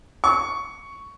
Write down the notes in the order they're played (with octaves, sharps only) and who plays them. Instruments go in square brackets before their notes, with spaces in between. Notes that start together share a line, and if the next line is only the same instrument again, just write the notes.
[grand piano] C#6